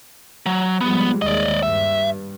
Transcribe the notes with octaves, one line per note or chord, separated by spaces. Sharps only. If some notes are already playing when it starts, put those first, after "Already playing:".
F#3
F3 G3 G#3 B3
D#2 G#3 D5 D#5
G2 E5